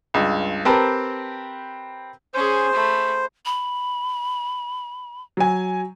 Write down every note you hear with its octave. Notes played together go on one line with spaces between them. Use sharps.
C#2 G2
C4 G4 A#4 B4 G5 A5
C#4 G#4 C5
A3 B5
B5
F#3 G#5